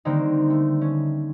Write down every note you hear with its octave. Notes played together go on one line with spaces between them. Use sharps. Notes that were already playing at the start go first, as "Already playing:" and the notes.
D3 D#3 G3 A#3 C4 D#4
A3
C#4